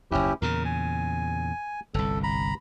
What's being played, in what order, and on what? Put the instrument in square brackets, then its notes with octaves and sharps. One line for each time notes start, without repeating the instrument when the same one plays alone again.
[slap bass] F#1 D#2 [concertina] C#4 E4 G4
[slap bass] E2 A#2 C#3 [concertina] A#4
[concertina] G#5
[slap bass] G1 C2 [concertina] A4
[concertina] A#5 B5